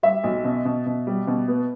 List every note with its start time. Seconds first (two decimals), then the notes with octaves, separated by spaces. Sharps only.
0.03 G3 E5
0.24 B1
0.44 B2
0.65 B2
0.86 B2
1.07 G3
1.27 B2
1.48 B3